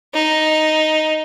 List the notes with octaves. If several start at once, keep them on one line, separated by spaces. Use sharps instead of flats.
D#4